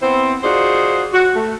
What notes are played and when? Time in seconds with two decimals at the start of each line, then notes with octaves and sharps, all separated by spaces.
0.02 B3 C4 E4 C5
0.43 D#4 F4 F#4 G#4 C5 D5
1.14 F#4
1.35 A3